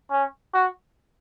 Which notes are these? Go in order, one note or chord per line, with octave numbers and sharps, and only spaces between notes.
C#4
F#4